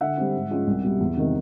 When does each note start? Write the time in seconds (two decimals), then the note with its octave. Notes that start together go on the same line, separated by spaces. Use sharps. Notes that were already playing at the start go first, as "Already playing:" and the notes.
0.01 D3 E5 F#5
0.17 G3 C4
0.34 G#2
0.50 F3 G#3 C#4 F4
0.67 C2
0.83 B2 G3
1.00 E2
1.17 C3 D#3 G3